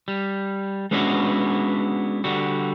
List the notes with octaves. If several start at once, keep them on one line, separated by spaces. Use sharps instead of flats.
G3
G#3 B3 C#4 D4 E4 F#4
D3 G3 F#4